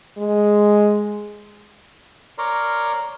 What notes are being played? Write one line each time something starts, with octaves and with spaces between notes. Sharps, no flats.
G#3
A#4 C#5 D5 A#5 C6